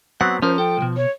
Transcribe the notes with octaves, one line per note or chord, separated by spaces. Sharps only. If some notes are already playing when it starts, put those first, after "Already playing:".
F#3 B3 C4 F#5
F3 C#4 A#4 C5
A4 G5
B1 B2
C#5